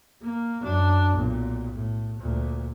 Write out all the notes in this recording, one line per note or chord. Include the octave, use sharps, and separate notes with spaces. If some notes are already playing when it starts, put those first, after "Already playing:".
A#3
F#2 D4
B1 A#2
A2
D2 A#2